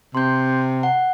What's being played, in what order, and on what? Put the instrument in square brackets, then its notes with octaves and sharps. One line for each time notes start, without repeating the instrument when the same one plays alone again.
[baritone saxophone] C3 [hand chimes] C6 G6
[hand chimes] F#5